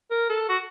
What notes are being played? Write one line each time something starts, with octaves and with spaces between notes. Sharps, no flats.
A#4
A4
F#4